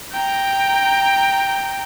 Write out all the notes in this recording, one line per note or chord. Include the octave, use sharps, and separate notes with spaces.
G5 A#5